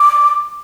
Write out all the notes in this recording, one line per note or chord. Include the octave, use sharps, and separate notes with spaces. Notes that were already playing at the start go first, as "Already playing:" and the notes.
Already playing: D6